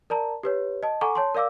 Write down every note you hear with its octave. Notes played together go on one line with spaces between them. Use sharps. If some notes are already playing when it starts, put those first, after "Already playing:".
A#4 D5 A5 A#5
G4 B4 C#5
D#5 A5
A4 F#5 G#5 A#5 C#6 D6
C#5 A5 C6
A#4 D5 F5 D6 E6